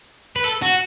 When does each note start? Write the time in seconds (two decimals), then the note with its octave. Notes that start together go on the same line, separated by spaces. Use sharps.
0.36 B4
0.44 A4
0.62 F#4